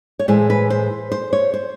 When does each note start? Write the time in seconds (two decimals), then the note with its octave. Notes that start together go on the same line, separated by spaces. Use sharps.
0.19 C#5
0.28 A2 E3 G#3 C5
0.50 B4
0.70 C5
1.12 C5
1.33 C#5
1.54 C5